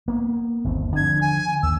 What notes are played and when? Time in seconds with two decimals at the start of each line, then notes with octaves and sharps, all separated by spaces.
0.08 A#3 B3
0.64 G1 D#2 C4
0.96 D3 F3 G#6
1.21 G#5
1.63 D#2 E6